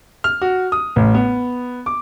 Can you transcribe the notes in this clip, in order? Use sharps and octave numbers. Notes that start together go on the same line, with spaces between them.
F6
F#4
D#6
A1
B3
D6